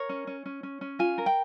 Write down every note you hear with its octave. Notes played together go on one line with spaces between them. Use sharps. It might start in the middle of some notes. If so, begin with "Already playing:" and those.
Already playing: A#4 C#5
C#4
C#4
C#4
C#4
C#4
F4 G#5
A#4
G5